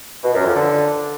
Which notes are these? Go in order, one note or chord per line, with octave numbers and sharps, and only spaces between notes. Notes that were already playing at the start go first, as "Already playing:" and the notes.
B2
F#2
F2
D3